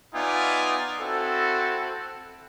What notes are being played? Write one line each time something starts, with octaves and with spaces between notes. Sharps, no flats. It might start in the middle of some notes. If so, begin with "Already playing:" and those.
B3 D#4 F4 D5 E5 G#5
C4 E4 F#4 A4